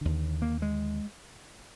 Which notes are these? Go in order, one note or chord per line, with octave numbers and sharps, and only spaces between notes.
D#2 D3
A#3
G#3